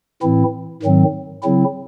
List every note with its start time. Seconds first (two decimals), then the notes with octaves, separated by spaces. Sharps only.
0.22 A2 E3 C4 E4
0.83 G#2 D#3 F#3 C4
1.43 C#3 F#3 C4 E4